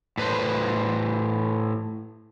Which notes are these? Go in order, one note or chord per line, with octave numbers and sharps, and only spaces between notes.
A2 B4 C5